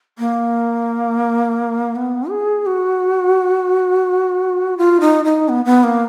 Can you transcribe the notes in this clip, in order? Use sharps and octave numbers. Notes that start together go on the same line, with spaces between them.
A#3
B3
G#4
F#4
F4
D#4
D#4
B3
B3
A#3